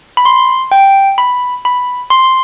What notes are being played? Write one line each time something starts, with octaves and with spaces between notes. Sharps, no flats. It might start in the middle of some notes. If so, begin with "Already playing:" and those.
B5
C6
G5
B5
B5
C6